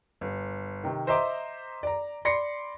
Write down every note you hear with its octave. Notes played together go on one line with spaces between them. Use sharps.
G1
C3 D#3
C5 D#5 E5 A#5 C6 D6
D5 A#5
D5 B5 C6 A#6 C7 C#7